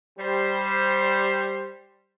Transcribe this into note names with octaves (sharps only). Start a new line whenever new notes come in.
G3 C5